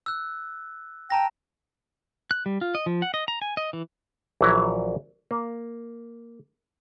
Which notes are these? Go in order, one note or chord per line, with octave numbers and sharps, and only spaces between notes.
E6 F#6
G5 A5 A#5 A#6
F#6
G3
F4
D#5
F3
F#5
D#5
A#5
G#5
D#5
E3
A#1 E3 F#3 E4 C#5 A#5
A#3